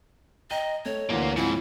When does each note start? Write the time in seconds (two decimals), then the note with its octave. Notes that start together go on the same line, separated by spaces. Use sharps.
0.51 D#5 G5 A#5 D#7
0.85 A3 C#5
1.10 D2 A#2 E3 A#3 G7
1.36 G#2 F3 C4 E4 F4